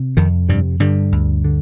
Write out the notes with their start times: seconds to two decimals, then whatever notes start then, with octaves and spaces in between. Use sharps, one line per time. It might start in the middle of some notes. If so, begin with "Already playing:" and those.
Already playing: C3
0.17 F2 D#3
0.49 G2 C3 G3
0.80 G2 D3 G3
1.12 D2
1.44 D3